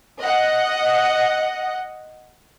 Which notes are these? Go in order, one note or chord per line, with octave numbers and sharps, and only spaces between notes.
D#5 F#5